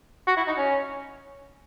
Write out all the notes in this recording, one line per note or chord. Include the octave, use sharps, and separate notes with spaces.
F#4
E4
D#4
C#4